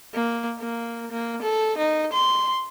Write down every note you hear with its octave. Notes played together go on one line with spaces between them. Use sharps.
A#3
A#3
A#3
A4
D#4
C6